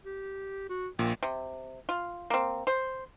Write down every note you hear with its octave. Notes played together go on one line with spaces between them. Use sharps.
G4
F#4
A#1 A#2 G5
C3
F4
A#3 C4
C5